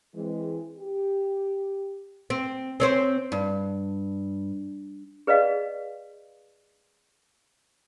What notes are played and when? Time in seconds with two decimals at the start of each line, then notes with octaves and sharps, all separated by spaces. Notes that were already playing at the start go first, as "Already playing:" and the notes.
0.15 E3 G#3 C4
0.79 G4
2.30 C4
2.80 C4 C#4 C5
3.32 G2
5.27 G#4 B4 D5 D#5 F5